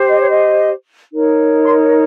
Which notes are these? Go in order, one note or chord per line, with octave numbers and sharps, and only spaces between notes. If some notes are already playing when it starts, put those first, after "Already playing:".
Already playing: G4 C5
D#5
C#5
D#5
D#4 A#4 C#5
C6